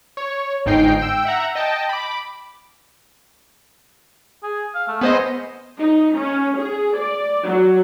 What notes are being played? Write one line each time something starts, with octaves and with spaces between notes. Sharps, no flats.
C#5
G1 G#2 D#4 G5 C7
G5 E6
E5 F#5 A#5
D#5 G5 A5
B5 D6
G#4
F5
A3
B3 G#4 C5 D#5
D#4
C#4
G#4
D5
F#3